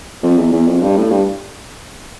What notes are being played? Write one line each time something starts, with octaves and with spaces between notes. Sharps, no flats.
F2
E2
E2
F2
G2
A2
G2